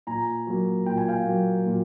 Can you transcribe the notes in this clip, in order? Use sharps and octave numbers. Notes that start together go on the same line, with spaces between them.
A#2 G#5 A#5
F#3 A#3
A#2 G5
G#5
F5 G5
F#3 A#3
A#2